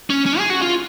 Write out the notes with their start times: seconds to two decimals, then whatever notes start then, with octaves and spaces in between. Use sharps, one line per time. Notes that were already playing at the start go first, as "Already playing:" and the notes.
0.10 C#4
0.26 C#4
0.38 G#4
0.50 F#4
0.62 F4